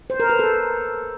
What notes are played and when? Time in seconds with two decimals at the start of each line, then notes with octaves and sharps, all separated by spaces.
0.10 C5
0.20 A#4
0.29 B4
0.39 A4